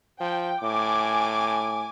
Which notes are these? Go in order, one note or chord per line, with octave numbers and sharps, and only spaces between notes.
F3 G5
A2 G#5 D6